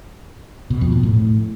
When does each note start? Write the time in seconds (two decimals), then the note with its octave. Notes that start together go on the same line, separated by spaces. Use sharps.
0.70 B2
0.81 F2
0.92 A#2
1.03 A2